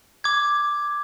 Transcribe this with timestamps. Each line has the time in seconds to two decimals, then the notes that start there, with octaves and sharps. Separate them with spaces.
0.24 D6 G#6